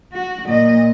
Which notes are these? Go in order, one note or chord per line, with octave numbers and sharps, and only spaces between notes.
F#4
A#2 D#5